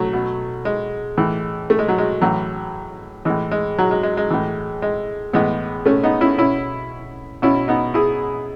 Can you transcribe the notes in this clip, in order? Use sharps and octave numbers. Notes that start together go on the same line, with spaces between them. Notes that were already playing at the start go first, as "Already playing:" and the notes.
Already playing: F#3 A3
B2
G#3
A2 E3
A3
G#3
F#3
G#3
A2 E3 F#3
A2 E3 G#3
G#3
F#3
G#3
G#3
G#3
A2 E3
G#3
A2 E3 G#3 B3
A3 C#4
B3 D#4
C#4 E4
B2 C#4 E4
B2 C#4 E4
B3 D#4
E4 G#4